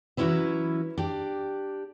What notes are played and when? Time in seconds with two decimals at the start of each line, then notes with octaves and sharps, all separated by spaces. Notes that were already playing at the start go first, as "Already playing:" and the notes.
0.17 E3 F#3 C#4 E4 B4 E5
0.98 D4 G4